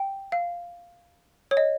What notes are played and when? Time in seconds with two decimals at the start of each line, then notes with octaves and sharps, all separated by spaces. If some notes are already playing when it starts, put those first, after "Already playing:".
Already playing: G5
0.32 F5
1.51 C#5
1.57 D#5